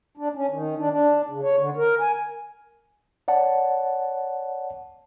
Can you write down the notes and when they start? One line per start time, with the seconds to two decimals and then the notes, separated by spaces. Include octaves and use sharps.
0.17 D4
0.35 C#4
0.50 D#3
0.78 D4
0.91 D4
1.28 C#3
1.43 C#5
1.58 D3
1.77 A#4
2.00 G#5
3.28 C#5 D5 F#5 A5